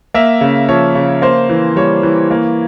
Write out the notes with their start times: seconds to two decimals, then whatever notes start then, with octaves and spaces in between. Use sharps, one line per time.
0.14 A#3 E5
0.41 C#3
0.68 F3 C#5
0.95 C#3
1.22 A#3 C5
1.50 E3
1.76 G3 C#5
2.03 E3
2.31 A#3